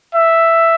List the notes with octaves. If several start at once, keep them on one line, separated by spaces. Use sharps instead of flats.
E5